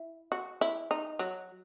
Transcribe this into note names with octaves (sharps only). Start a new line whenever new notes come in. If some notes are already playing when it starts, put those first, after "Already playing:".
Already playing: E4
F#4
E4
D#4
F#3